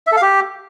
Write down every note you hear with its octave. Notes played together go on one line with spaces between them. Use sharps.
E5
A4
F5
G4